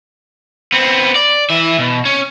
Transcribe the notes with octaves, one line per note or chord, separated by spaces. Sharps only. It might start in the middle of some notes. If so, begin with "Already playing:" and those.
B3 C4
D5
E3 E5
B2
C#4